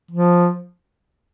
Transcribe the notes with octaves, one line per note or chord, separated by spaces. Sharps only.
F3